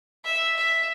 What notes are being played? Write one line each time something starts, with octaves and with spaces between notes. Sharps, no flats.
E5
E5